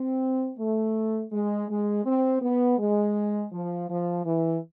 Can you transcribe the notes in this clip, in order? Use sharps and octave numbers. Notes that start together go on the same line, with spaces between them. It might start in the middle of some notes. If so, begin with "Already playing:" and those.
Already playing: C4
A3
G#3
G#3
C4
B3
G#3
F3
F3
E3